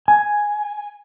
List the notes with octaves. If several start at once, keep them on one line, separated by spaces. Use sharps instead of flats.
G#5